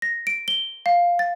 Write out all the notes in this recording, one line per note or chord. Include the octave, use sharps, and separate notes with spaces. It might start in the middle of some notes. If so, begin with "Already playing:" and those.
A#6
D7
G7
F5
A6